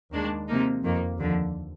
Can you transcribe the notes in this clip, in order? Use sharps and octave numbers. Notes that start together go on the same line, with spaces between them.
D#2 D#3 G#3 D4
C3 F3 A#3 D#4
F2 D#3 A#3
D#2 D3 F3